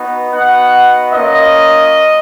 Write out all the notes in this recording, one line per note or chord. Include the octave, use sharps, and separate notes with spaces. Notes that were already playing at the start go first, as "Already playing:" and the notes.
Already playing: B3 D#4 F#4
B3 D#4 F#4 F#5
A#3 C#4 F4 D#5